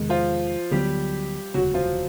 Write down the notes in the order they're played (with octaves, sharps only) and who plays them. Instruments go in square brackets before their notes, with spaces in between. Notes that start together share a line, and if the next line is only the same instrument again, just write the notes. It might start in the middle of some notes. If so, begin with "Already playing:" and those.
Already playing: [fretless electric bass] E2 C3 D#3 G#3
[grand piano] F3 F4
[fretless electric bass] D2 D3 F#3 B3 [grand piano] G3 G4
[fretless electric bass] E1 D2 C#3 [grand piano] F#3 F#4
[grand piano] F3 F4